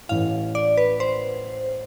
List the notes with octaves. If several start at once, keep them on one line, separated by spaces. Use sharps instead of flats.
A1 A2 E3 F5
D5
B4
C5